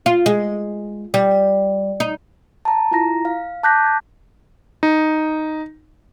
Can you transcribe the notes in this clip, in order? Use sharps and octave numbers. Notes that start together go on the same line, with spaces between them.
F4
G#3
G3
D#4
A5 A#5
E4 F4 A#5 A#6
F5
A5 D6 F#6 G6 A#6 B6
G#6
D#4